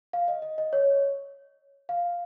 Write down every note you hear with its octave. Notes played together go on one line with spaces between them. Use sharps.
F5
D#5
D#5
D#5
C#5
F5